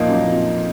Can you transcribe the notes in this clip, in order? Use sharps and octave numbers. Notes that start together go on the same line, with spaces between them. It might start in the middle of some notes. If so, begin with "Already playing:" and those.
Already playing: A#2 F3 A#3 D#4
F#2
F2